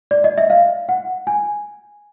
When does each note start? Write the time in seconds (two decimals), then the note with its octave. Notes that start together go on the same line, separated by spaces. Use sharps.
0.11 D5
0.24 D#5
0.38 E5
0.50 F5
0.89 F#5
1.27 G#5